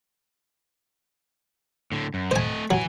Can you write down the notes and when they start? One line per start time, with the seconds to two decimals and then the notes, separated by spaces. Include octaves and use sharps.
1.92 A2 D3
2.14 F#2
2.31 A3 C5 D#5 G#5
2.71 E3 F#3 G#5